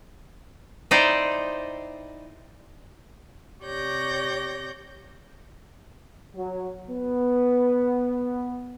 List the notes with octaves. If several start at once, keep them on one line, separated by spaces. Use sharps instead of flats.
D#4 E4 C5 D5 D#5 G5
C3 G4 C#5 D5 G6 A#6
F#3
B3